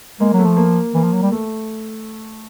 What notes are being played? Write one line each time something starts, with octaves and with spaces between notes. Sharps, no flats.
G#3 A#3
F#3
A3
F3
A#3
E3 A#3
F3
F#3
G3
A3